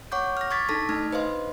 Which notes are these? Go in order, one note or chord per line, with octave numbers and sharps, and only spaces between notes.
C#5 F#5 C#6 D6 G6
F6 A#6
C#6 D6 G#6 A6 B6
D4 D#4 A4 A5 A#6 B6
A3 D4 D#4 F6 G#6
B4 C5 D#5 F5 C6